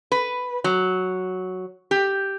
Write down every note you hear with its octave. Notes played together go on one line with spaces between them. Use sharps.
B4
F#3
G4